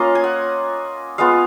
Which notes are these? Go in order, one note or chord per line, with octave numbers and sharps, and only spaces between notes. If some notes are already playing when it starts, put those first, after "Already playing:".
Already playing: A#3 C#4 F4 D#5 F5
G#5
F#5
G#3 B3 F4 F5